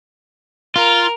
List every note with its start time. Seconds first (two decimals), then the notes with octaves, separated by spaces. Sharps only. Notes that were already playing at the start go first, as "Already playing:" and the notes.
0.76 F4 A#4